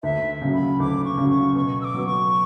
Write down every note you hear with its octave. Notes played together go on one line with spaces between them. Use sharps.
D2 E5
C#3 F#3
B5
D2 D6
C#6
C#3 F#3
C#6
B2 C#6
E6
D6
F#3 B3
C#6